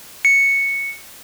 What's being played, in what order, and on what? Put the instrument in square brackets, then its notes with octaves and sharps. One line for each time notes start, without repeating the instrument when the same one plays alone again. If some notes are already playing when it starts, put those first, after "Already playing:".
[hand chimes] C#7